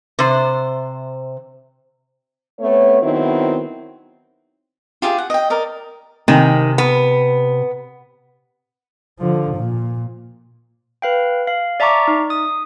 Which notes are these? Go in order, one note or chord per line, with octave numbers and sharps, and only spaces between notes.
C3 C5
A3 B3 C4 C#5
D#3 F#3 B3 C4 D#4 E4
F4 G4 G#4 E5
F#5
D#5 G5
A#4 D5 D#5
C3 D#3 G#5
B3
D3 F3
A#2
B4 F5 G5
F5
D5 E5 A5 A#5 C#6 D6
D#4
D#6